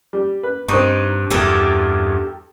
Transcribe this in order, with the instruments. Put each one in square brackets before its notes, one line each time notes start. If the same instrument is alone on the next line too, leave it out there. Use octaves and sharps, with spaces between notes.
[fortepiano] G3
B4
[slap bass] G2 [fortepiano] C4 C#6 [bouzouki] D#4
[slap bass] E2 G2 [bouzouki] G4 A4 A#4